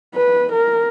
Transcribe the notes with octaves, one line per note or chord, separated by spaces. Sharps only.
B4
A#4